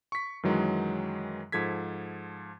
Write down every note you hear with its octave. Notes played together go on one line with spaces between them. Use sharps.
C#6 B6
F#2 D#3 E3 F#3 G#3
G#2 F3 A4 G#6 B6